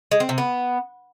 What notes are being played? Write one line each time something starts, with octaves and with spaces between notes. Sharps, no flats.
G#3
C4
C3
B3